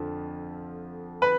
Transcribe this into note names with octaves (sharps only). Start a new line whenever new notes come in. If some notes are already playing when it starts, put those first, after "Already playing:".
Already playing: F2 D3 F3
B4